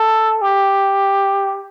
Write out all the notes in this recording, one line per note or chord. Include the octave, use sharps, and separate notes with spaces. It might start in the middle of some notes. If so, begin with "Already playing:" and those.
Already playing: A4
G4